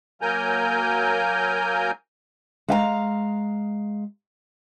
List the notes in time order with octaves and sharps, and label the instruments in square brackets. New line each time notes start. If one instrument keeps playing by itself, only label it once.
[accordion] F#3 A#3 A#4 G#5 A#5 G6
[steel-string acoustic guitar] G#3 F5 G5 A#5